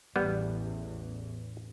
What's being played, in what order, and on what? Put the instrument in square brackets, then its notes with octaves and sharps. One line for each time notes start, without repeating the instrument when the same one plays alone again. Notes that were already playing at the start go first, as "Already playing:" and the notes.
[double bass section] A1 E2 [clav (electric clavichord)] G3 B3